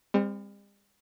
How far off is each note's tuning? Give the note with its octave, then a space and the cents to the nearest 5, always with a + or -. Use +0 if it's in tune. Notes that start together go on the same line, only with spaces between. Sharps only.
G3 +45 C4 +0